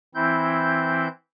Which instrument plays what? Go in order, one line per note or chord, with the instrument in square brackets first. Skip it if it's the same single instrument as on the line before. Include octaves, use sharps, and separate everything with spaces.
[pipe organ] E3 C4 E4 G6